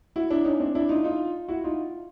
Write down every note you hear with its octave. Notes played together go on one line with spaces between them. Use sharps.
E4 F#4
D4 E4
C#4 D#4
C4 D4
D4 E4
D#4 F4
D#4 F4
E4 F#4
D#4 F4